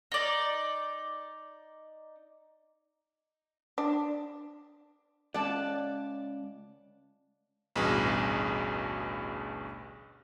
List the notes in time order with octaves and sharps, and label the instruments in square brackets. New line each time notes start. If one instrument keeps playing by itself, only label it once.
[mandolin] D#4 D5
[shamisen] D4
[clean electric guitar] C#2 [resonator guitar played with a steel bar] D5 [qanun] F#5 A5
[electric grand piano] A1 D2 G2 B2 G#4